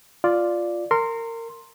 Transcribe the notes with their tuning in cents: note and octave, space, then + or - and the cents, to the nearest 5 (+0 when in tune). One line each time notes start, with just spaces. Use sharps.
F4 +0 D5 +0
A#4 -25 C6 +5